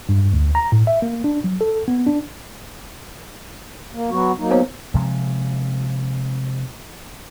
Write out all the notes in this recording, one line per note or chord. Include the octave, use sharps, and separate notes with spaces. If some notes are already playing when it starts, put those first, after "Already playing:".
G2
D2
A#5
A2
E5
A#3
D4
F#3
A4
B3
D4
A#3
F#3 B3 F#4
F#3 A#3 D#4
B3 C5 C#5
C3 F3 G#3